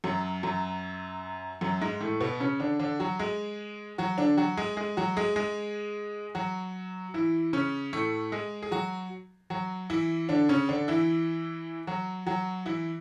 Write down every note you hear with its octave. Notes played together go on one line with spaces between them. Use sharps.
F#2 F#3
F#2 F#3
F#2 F#3
G#2 G#3
A2 A3
B2 B3
C#3 C#4
D3 D4
D3 D4
F#3 F#4
G#3 G#4
F#3 F#4
D3 D4
F#3 F#4
G#3 G#4
G#3 G#4
F#3 F#4
G#3 G#4
G#3 G#4
F#3 F#4
E3 E4
C#3 C#4
A2 A3
G#3 G#4
G#4
F#3 F#4
F#3 F#4
E3 E4
D3 D4
C#3 C#4
D3 D4
E3 E4
F#3 F#4
F#3 F#4
E3 E4